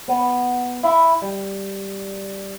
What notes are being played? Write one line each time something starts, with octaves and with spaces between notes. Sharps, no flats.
B3
E4
G3